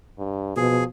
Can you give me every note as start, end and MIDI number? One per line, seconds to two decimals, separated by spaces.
0.18 0.54 43
0.57 0.84 47
0.57 0.85 53
0.57 0.84 68